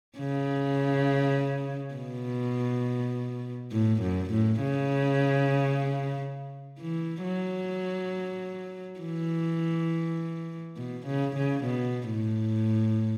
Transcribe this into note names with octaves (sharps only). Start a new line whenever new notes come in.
C#3
B2
A2
F#2
A2
C#3
E3
F#3
E3
B2
C#3
C#3
B2
A2